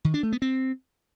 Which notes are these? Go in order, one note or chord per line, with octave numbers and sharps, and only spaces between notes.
D#3
D4
A3
B3
C4